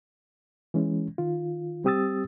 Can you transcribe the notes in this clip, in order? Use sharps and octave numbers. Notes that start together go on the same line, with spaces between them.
E3 G#3 C#4
D#3 F4
G3 C4 G4 D#6 E6 A6